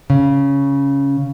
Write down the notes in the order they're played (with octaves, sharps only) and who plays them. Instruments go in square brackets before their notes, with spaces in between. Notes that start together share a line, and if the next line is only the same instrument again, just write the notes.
[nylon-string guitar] C#3